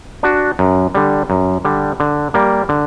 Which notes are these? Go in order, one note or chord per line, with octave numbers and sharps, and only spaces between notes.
D4 F#4
F#2
D3 G3
F#2
D3 G3
D3
G3 A#3
D3